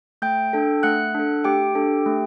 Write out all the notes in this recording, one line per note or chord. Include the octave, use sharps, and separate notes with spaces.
A3 G5 G6
D4 A4
A3 F#5 F#6
D4 A4
A3 G4 G5
D4 A4
A3